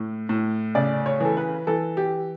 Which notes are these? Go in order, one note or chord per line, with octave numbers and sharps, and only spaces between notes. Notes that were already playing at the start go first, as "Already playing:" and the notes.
Already playing: A2
A2
C#3 D5
C#5
E3 A4
B4
E3 A4
G4